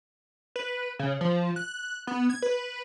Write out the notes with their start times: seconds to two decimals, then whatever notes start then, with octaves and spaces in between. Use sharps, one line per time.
0.56 B4
0.99 C#3
1.21 F3
1.56 F#6
2.07 B3
2.30 G#6
2.42 B4